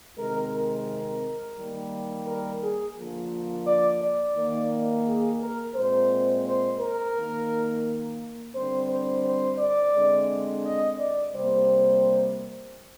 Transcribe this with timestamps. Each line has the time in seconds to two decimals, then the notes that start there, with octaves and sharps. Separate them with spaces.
0.17 C3 D#3 G#3 C4 A#4
0.52 A#4
1.57 D#3 G3 A#3
2.27 A#4
2.61 G#4
2.97 D3 F3 A#3
3.66 D5
4.01 D5
4.37 D#3 A#3
5.06 G#4
5.41 A#4
5.75 A#2 G#3 C4 C5
6.46 C5
6.80 A#4
7.15 D#3 A#3
8.54 D3 G3 C4 C5
8.89 C5
9.24 C5
9.59 D5
9.94 D3 G#3 C4
10.65 D#5
10.99 D5
11.34 C3 G3 A#3 C5